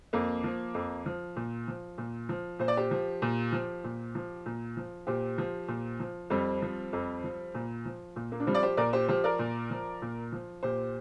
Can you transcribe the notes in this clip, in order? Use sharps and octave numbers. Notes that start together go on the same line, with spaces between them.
F2 A#3
F3
F2
F3
A#2
F3
A#2
F3
A#2 C5
D5
G4 C5
F3
A#2
F3
A#2
F3
A#2
F3
A#2 G4 C5
F3
A#2
F3
F2 G3 C4
F3
F2
F3
A#2
F3
A#2
A#3
D4
F3 G3 C4
D5
G4 C5
A#2 A#4 D5
G4 C5
F3 G4 C5
A#4 D5
A#2
F3
A#2
F3
A#2 G4 C5